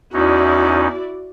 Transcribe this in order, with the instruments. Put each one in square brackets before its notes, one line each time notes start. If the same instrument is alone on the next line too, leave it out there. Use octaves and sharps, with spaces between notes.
[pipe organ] E2 C#4 D#4 [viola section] E4 F#4 D5